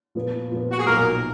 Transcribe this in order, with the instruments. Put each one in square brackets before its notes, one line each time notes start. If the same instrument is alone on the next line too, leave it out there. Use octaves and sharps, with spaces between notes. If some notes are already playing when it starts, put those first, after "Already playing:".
[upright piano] A#2 F3 B3
A#2 F3 B3
[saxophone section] F#4
G#4
[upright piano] B1 A#2 F3 [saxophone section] A#3 A#4